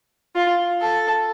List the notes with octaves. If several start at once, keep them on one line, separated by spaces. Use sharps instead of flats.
F4
A4